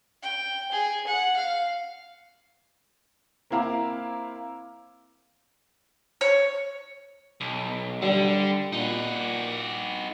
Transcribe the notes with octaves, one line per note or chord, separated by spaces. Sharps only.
G5
G#4
F#5
F5
A#3 C4 E4 F5 A#5 D6
C#5
B1
D3 G3
A#2 D#4 F#4